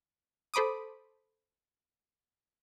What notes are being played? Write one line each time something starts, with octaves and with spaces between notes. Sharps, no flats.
A4 C5 B5 D6 D#6